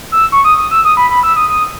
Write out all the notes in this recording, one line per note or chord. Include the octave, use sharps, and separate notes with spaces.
E6
C#6
D#6
D#6
E6
D#6
B5
B5
E6
D#6
D#6